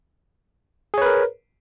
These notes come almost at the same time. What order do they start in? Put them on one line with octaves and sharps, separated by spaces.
G#4 C#5 B4 A#4